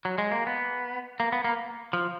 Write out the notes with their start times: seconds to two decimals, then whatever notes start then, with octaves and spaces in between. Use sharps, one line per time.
0.05 F#3
0.18 G#3
0.32 A#3
0.47 B3
1.20 A#3
1.32 B3
1.44 A#3
1.93 F3